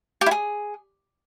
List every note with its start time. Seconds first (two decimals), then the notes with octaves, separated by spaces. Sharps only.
0.21 G4
0.26 E4
0.31 G#4